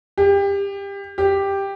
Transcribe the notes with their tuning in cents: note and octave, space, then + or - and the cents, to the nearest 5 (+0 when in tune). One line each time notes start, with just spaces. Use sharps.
G4 +25
G4 +5